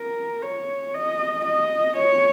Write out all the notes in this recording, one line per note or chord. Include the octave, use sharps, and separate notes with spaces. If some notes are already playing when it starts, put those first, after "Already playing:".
Already playing: A#4
C#5
D#5
D#5
C#5